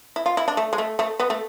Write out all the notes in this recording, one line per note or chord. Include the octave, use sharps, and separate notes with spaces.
E4
F4
E4
D4
A3
G#3
A3
A3
B3
A3